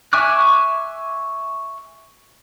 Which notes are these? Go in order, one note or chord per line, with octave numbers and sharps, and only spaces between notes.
E5 G#5 C#6 D6 F#6